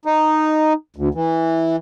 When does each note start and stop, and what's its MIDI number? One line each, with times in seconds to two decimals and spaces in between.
0.05 0.73 63
0.96 1.09 38
1.14 1.76 52